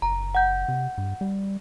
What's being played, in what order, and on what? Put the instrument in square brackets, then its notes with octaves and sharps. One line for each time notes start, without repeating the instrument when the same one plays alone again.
[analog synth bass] F#1 [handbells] A#5
[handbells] F#5 G6
[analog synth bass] C3
G2
G3